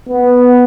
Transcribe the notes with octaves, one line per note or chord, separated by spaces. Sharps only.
B3